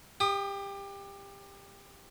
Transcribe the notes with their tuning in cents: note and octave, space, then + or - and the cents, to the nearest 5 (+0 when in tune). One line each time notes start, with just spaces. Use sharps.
G4 +20 D#6 -30